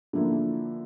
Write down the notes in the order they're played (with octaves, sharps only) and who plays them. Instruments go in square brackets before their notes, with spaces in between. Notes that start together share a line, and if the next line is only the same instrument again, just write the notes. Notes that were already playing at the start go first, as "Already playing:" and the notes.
[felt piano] D3 F3 A#3 E4